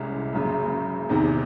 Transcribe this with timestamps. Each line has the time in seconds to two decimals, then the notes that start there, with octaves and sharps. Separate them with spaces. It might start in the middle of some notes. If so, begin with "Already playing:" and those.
Already playing: C2 C3 E3 G#3 C#4
0.33 F#1 F#2 C#3
1.09 E2 C3 D#3